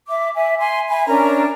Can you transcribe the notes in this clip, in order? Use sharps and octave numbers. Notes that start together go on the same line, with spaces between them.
E5 D6
E5 G#5
G#5 C6
E5 G#5 B5
C#4 D4 A#4 A#5